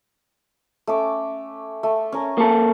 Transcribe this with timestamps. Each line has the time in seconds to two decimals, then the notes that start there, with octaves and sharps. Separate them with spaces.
0.87 A3 C#4 D6
1.83 A3
2.12 C#4 A#4 C#5
2.38 A#3 A4